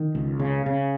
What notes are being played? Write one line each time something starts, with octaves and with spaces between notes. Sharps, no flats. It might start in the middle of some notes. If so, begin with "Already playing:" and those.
Already playing: D#3
C#2
C#3
C#3